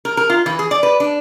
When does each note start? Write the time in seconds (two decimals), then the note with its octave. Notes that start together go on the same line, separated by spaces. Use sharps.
0.05 A#4
0.17 A#4
0.30 F4
0.46 E3
0.59 G#4
0.71 D5
0.83 B4
1.00 D4